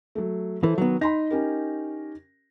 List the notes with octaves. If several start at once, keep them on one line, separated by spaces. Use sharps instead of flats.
F#3 A3
E3 E4 A4 C5
D#3 F#3 B3
D#4 B5 C6 A#6
C#4 G4 A#4